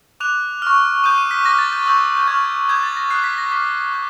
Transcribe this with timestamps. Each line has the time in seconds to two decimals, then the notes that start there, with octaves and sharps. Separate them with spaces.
0.20 D6 F#6 F7
0.62 C#6 F6
1.04 D#6 G6 D#7
1.18 D#7
1.31 B6
1.45 D6 F6 A#6
1.59 A6
1.73 G6
1.86 C#6 E6 G6
2.17 G6
2.27 C#6 F6 G#6
2.69 D#6 G6 G#6
2.83 A6
2.97 A#6
3.10 D#6 F#6 C7
3.24 B6
3.38 A#6
3.52 D6 F6 B6
3.93 D6 G6